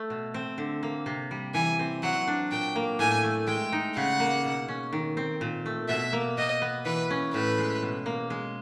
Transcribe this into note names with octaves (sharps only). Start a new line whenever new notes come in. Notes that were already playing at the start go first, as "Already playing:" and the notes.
Already playing: A3
B2
C4
D3
A#3
C3
G3
E3 G#5
C4
F#3 F#5
D4
A#2 G5
A#3
A2 G#5
A3
G#3 G5
D#4
C#3 F#5
A#3
B2
C#4
D#3
C4
A#2
A3
B2 E5
A#3
B2 D#5
B3
E3 B4
C#4
A2 B4
G#3
B2
A#3
G#3